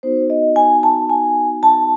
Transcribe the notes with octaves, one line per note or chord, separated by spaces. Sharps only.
B3 D#4 F#4 C5
D#5
G#5
A5
G#5
A5